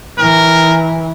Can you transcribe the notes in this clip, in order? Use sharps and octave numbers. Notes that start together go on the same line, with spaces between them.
E3 A#4